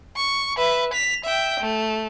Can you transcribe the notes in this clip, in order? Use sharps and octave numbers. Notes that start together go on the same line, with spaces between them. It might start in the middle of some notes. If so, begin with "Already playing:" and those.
C#6
B4 E5
B6 F7
E5 G5
A3